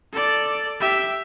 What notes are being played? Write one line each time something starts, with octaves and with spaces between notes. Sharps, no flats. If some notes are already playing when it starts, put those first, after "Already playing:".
A4 D5
G4 E5